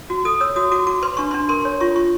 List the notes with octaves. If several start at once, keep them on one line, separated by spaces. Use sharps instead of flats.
F#4
A4 D#6
C#5 E6
F#4 D#6
F#4 D6
F#4 D6
B4 C6
D4 C#6
C6
D4
A#4 C6
C#5
F4 C#6
F4 C#6